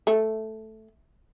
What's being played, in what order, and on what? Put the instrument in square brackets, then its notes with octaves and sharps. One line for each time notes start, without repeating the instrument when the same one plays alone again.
[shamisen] A3